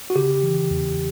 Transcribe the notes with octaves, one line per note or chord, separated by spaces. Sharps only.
F#4
C#3 G4
E3
E2